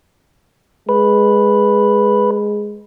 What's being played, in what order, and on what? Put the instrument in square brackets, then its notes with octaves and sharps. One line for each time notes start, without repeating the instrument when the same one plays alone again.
[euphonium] G#3 [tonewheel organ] B4